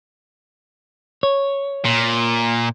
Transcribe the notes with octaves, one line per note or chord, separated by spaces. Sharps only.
C#5
A#2